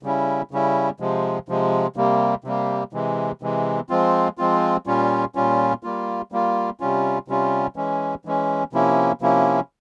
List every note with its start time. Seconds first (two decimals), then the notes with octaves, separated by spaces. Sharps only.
0.03 C#3 G3 C#4 E4
0.51 C#3 G3 C#4 E4
1.00 C3 F3 G#3
1.49 C3 F3 G#3
1.96 C3 G3 A#3
2.44 C3 G3 A#3
2.93 C3 E3 G#3
3.42 C3 E3 G#3
3.89 F3 G#3 C4 F4
4.38 F3 G#3 C4 F4
4.86 A#2 G3 C#4 F4
5.35 A#2 G3 C#4 F4
5.83 G3 A#3 F4
6.32 G3 A#3 F4
6.80 C3 G3 C#4 F4
7.28 C3 G3 C#4 F4
7.76 E3 G#3 C#4
8.25 E3 G#3 C#4
8.73 C3 F3 A#3 C#4 E4
9.21 C3 F3 A#3 C#4 E4